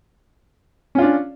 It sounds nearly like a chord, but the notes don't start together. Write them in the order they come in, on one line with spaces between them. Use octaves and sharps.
C#4 F4 D4